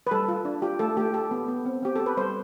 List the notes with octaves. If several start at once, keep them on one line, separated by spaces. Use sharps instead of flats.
B4
G3 A4
F4
D4
F4 G4
A3 A4
A3 G4
G4 A4
B3
B3
C4
C4 G4
G4 A4
B4
G3 C5